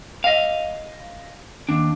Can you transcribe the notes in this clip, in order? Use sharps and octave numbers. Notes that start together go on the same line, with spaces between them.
D#5 F5
D#2 D4